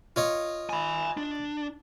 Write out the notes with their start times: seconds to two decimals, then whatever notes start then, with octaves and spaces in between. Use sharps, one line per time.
0.16 F4 C#5 D#5
0.69 G#5 B5
1.17 D4